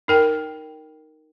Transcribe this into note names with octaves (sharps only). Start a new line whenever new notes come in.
D#4 A#4 G5